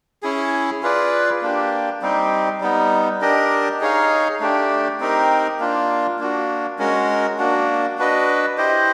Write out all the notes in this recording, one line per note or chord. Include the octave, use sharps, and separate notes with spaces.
C#4 E4 G#4
F4 G#4 B4 D5
A#3 D4 G4
G3 C4 D#4 G4
G3 B3 D#4
D4 G4 A#4 D#5
D#4 G#4 C#5 F5
A3 D4 G4
C4 D#4 G4 A#4
A#3 D4 F4
A#3 D4 F#4
G#3 C#4 F#4 A#4
A#3 D4 F#4
D4 F#4 B4 D#5
E4 G4 C5 D#5